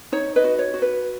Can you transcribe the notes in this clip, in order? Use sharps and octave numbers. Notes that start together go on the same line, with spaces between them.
D#4 C#5
B4 D#5
F#4
C#5
F#4
B4